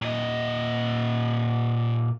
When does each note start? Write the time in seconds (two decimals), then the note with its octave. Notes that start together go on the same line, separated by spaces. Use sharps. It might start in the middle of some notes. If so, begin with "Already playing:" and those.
0.02 A#2 D#5